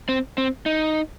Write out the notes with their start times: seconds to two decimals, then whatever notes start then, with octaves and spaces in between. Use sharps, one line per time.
0.09 C4
0.38 C4
0.66 D#4